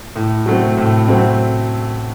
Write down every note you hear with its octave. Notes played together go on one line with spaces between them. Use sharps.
A2
F#3 A3 C4
A2
F#3 A3 C4